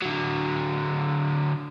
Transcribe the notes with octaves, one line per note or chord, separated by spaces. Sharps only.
D3 F#3